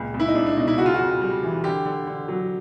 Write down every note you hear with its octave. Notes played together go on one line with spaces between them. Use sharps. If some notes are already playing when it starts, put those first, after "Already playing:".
Already playing: C#2 A#2
C#2
E4
D#4
C#2 D4
D4
B2 D#4
E4
C#3 F#4
F4
F#4
F2
G3
E3
D3 G4
D3
D3
F#3